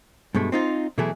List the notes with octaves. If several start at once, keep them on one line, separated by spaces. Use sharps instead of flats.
G2 B2 G#3 A3
C4 D#4 F4
B2 E3 F#3 A3 E4 G#4